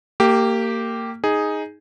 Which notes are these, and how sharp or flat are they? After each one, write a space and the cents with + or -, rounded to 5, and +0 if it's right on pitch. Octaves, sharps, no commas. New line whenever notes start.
A#3 -25 G4 -5
D#4 +5 G#4 +0